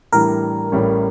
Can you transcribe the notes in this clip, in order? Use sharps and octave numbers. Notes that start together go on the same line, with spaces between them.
A2 E3 G3 D4 A#4
A1 A2 G3 C#4